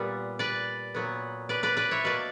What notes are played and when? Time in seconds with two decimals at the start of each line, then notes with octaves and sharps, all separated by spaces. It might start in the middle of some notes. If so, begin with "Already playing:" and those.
Already playing: A#2 G3 B3 G4
0.39 B4 D5
0.95 A#2 F#3 B3
1.49 B4 D5
1.63 B4 D5
1.77 B4 D5
1.91 C#5 E5
2.04 B2 A#3 B4 D5